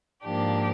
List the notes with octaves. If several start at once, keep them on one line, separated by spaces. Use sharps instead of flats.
G#2 F3 A#3 D4 G4